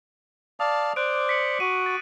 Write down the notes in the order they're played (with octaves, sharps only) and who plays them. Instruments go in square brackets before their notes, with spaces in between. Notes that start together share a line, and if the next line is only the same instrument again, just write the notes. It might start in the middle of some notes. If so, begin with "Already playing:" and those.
[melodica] D5 F5 A5 [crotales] D#6
[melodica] C5 D5 [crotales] D6 F#6 D7
[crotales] B6 C#7 F#7
[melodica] F#4 [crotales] D#7
[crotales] A6 D#7